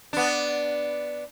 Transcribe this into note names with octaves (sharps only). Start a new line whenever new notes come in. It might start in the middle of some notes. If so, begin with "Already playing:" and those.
B3 D4